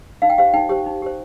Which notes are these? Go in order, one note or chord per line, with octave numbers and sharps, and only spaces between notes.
D#4 F5
G5
G4 C5 F5
D#4 G5
G4 C5
D#4
G4 C5